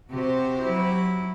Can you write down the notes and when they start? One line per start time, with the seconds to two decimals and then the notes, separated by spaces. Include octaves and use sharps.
0.11 C3 F#4 G4 C5
0.61 F#3 E4